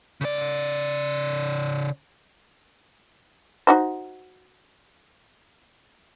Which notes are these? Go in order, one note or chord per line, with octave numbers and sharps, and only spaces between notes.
C#3 D5
D#4 F#4 C5